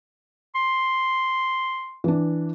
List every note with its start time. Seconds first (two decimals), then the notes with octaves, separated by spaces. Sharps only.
0.55 C6
2.04 E3 D4